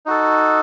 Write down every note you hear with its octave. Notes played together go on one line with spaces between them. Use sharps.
D#4 F#4 A4